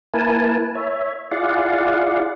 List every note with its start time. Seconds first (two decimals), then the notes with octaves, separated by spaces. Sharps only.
0.14 A#3 E4 A#4 B4 G#5 A5
0.75 C#5 E5
1.31 E4 F4 G#4 D5 F5 F#5